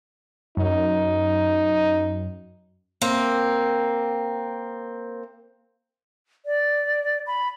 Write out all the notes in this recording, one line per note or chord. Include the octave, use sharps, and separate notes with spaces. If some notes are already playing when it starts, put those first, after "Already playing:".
F#2 D#4
A#3 C4
D5
B5